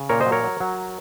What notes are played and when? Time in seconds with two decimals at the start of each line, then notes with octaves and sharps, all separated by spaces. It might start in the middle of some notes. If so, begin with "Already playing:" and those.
Already playing: C#3
0.09 A#2 A#4 C#5
0.21 C5 D#5
0.26 F#3
0.32 A#4 C#5
0.44 F#3
0.60 F#3